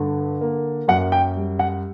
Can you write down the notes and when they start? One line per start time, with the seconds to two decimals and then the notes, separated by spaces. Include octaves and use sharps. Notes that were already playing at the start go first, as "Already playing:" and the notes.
Already playing: G2 D3
0.41 A#3
0.88 F#2 F#5
1.12 G5
1.36 G3
1.59 F#5